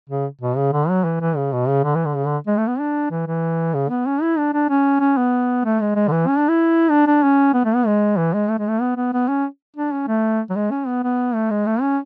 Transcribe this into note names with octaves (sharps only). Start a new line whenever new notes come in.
C#3
B2
C#3
D3
F#3
E3
E3
C#3
B2
C#3
D3
E3
D3
C#3
D3
G#3
A3
B3
D4
E3
E3
C#3
B3
C#4
E4
D4
D4
C#4
C#4
B3
A3
G#3
G#3
D3
E3
C#4
D4
E4
D4
D4
C#4
B3
A3
B3
G#3
E3
G#3
A3
G#3
A3
B3
B3
B3
C#4
D4
C#4
A3
F#3
G#3
C#4
B3
B3
A3
G#3
A3
C#4